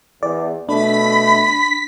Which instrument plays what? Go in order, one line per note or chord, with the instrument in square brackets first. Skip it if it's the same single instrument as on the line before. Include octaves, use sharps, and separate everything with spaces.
[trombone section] E2 [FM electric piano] D5
[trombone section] B2 A3 [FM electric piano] D4 [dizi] B5 [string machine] B6